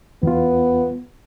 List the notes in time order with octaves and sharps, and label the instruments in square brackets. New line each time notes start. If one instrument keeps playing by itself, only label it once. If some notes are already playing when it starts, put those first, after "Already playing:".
[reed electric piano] E2 F4 [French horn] B3